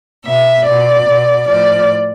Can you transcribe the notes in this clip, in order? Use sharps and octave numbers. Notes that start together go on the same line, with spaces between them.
B2 E5
B2 D5
B2
A2 F3 D5